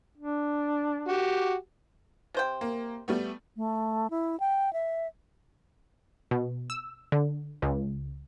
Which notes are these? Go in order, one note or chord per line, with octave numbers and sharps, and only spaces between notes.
D4
F#4 G4
C3 C5 G5
A#3
G3 A3 B3
A3
E4
G5
E5
B2
E6
D3
C#2